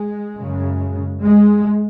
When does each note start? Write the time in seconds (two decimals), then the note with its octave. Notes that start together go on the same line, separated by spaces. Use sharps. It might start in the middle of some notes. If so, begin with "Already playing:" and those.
Already playing: G#3
0.35 F#2 C#3
1.22 G#3